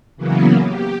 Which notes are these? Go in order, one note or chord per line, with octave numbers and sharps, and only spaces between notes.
C#3 E3 F#3 A#3 B3
G4